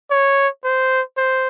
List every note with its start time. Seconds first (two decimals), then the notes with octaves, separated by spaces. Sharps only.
0.11 C#5
0.64 C5
1.17 C5